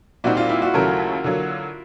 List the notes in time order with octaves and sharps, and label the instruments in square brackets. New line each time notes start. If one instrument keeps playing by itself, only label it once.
[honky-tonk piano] A#2 G3 C4 D#4 [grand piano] F#4
[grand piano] F4
E4
F#4
[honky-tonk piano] D#2 C#3 F#3 A3 [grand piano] A#4
[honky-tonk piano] D3 F#3 A#3